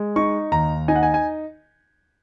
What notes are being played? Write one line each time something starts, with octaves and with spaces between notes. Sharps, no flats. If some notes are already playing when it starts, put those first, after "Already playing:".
Already playing: G#3
D#4 C#6
D#2 A#5
D#4 G#5
F#5
G#5
G#5